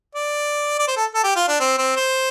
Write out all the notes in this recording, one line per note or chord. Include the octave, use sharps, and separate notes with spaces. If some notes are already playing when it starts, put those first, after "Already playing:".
D5
D5
C5
A4
A4
G4
F4
D4
C4
C4
C5